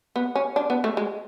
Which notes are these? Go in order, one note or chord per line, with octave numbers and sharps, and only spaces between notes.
B3
C#4
D4
B3
A3
G#3